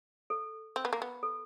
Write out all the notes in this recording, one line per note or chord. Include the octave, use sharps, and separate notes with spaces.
A4
C4
B3
A#3
B3
A4